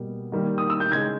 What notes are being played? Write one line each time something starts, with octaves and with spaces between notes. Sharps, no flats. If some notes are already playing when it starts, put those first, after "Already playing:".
Already playing: B2 G3 A#3
D#3 G3 A#3
D#6
E6
G6
C#3 G#3 G#6